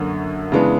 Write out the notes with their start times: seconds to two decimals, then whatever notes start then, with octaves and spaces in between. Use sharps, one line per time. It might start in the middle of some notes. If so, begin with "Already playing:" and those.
Already playing: F#2 D3 F#3 A#3
0.52 C#3 E3 G#3 B3 D4